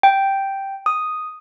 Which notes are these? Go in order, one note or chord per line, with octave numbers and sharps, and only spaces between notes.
G5
D#6